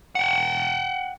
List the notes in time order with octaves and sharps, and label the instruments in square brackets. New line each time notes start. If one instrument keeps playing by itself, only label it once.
[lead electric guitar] F#5 G5